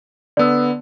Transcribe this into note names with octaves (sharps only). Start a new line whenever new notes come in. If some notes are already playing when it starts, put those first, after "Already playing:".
D3 B3 D5 E6